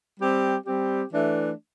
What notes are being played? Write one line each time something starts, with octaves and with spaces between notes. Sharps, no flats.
G3 C4 G4
G3 C4 G4
E3 A3 D4